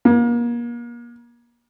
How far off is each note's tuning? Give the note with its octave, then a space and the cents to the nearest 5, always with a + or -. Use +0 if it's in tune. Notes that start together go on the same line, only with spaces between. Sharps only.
A#3 +35